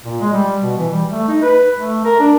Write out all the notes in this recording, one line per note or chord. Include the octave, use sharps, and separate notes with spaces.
A#2
G#3
G3
B2
E3
G3
A3
D#4
B4
A3
A#4
D4